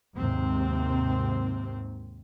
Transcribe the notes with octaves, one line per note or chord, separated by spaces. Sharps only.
D#2 G#2 C3 C4